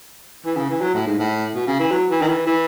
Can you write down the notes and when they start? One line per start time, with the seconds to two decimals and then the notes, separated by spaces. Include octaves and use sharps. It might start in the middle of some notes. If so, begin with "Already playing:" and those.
0.46 E3
0.57 C#3
0.69 E3
0.81 F#3
0.94 A2
1.07 G#2
1.19 A2
1.55 B2
1.67 C#3
1.79 E3
1.91 F#3
2.10 E3
2.21 D#3
2.29 E3
2.47 E3